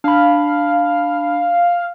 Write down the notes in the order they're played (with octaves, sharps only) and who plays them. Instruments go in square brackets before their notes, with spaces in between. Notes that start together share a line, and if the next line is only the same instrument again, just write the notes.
[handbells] D4 B5 [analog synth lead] F5